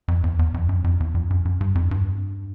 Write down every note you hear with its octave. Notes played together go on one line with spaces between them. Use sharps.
F2
E2
E2
F2
F#2
F2
E2
F2
F#2
F#2
G2
F2
G2